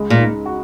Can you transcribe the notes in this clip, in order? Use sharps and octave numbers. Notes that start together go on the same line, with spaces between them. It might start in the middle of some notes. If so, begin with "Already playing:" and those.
Already playing: C#2 G#3
A#2
D#4
F#4